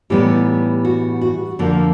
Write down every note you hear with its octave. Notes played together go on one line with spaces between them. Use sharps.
A2 E3 G3 B3 D#4 G4
F#4
F#4
F2 D3 F3 A#3